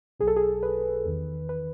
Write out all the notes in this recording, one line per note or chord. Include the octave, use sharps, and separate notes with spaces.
B1 B2 G#4
A4
G#4
B4
E2 D#3
B4